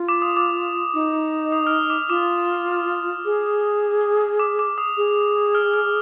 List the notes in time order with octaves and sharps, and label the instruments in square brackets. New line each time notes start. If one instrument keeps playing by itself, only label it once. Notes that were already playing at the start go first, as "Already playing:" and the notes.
Already playing: [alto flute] F4
[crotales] D6
D#6
D6
[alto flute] D#4
[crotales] D#6
F6
D#6
D6
[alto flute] F4 [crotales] D6
[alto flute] G#4
[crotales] D6
D6
D#6
[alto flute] G#4
[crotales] F6
F6